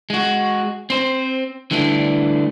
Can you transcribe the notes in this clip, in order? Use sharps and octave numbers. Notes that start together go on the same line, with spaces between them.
G#3 F#4
C4 C5
D3 E3 G3 A3 D4